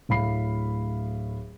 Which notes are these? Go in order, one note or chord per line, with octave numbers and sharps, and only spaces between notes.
D1 A2 F5 B5 C7